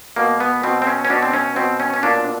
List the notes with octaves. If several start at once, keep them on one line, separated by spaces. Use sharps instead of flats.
B2 A#3
B3
B2 C4
C4
C#4
C#4
B2 D4
C4
C#4
B2 C4
C#4
C#4
A#2 D4